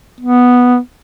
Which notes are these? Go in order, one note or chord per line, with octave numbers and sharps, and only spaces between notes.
B3